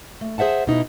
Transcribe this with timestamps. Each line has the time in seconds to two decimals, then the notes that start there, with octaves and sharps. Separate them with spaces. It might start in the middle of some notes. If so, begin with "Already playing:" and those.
0.21 A3
0.38 G#4 C5 E5 F#5 A5
0.67 B2 D#4 E4